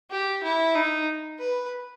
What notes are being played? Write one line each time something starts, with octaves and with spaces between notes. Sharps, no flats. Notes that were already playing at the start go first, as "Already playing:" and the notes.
G4
E4
D#4
B4